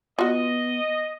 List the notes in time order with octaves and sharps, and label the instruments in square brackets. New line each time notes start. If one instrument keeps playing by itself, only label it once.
[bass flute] B3 [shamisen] F4 F#4 [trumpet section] D#5